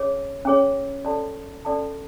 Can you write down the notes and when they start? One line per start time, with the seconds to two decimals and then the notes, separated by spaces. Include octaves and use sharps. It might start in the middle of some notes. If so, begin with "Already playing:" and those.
Already playing: C#4 G#4 C#5
0.45 C#4 G#4 C#5
1.05 C#4 F#4 A4 D5 A5
1.65 C#4 F#4 A4 D5 A5